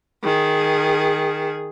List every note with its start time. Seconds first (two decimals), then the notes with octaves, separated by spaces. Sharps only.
0.23 D#3 G#4